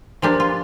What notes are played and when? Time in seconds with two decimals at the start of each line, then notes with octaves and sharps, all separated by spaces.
0.22 F3 A#3 D4 G4
0.40 F4